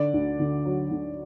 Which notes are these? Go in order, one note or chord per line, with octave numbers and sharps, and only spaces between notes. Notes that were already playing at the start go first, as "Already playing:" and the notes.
Already playing: D3 D5
D2
D3
F#3
D3